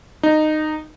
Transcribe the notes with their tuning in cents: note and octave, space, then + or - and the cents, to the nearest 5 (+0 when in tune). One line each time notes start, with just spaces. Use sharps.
D#4 -15